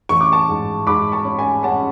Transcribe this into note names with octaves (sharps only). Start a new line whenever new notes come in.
A1 C#6
D6
A5 C#6
G#2
G#2 B5 D6
A5 C#6
C#4
G#5 B5
C#4 F#5 A5